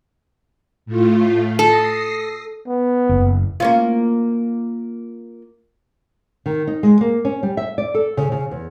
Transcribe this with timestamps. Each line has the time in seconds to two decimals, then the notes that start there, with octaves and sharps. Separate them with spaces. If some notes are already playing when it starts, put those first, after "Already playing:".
0.86 A2 A3 F4
1.59 A4 D#6 A#6 C7
2.68 B3
3.09 F#1
3.60 A#3 C#4 F4
6.46 D#3
6.67 D#4
6.83 G#3
7.01 A#3
7.25 C#4
7.43 G3
7.57 E5
7.78 D5
7.94 A4
8.17 C#3
8.32 C#3
8.51 E2